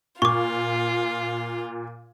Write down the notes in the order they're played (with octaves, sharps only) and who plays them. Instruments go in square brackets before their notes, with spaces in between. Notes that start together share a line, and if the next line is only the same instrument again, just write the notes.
[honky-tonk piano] A#2 [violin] F4 [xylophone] C#6 D6